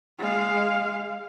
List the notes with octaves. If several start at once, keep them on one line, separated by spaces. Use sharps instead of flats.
G#3 F5